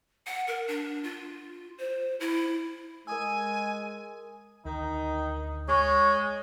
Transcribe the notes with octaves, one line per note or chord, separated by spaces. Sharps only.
F#5
A#4
D4
F4
C5
E4
G#3 A#4 G#5 D#6 E6
D2 D#3 D#4
G#3 C#5 C#6